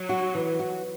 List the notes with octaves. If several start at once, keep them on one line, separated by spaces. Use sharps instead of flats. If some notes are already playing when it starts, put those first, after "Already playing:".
Already playing: F#3
F#4
E3
F#4